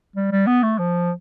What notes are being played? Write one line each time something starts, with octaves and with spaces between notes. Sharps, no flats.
G3
G3
B3
A3
F3